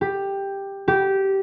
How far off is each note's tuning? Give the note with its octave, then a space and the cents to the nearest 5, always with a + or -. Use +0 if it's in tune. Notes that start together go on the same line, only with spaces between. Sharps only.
G4 +10
G4 -15